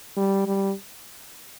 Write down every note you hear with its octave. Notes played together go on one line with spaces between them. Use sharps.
G3
G3